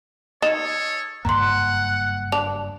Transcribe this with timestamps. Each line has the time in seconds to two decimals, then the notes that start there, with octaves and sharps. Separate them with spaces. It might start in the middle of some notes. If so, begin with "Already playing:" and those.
0.42 D#4 G#4 A4 C#5 A6 E7
1.25 F#1 G2 A#3 F#5 A#5 C6
2.32 D4 F7